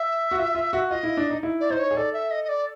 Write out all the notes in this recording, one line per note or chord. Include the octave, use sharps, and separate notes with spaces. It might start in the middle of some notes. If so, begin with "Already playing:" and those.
Already playing: E5
F#4
F4
F4
F#4
F4 D#5
E4
D4
D#4
E4
D5
D#4 C5
C#5
G#4
A4 D5
E5
D#5
D#5
D5